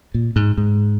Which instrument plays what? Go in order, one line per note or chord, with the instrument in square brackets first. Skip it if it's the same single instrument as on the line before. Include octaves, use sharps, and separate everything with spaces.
[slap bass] A#2
G#2
G#2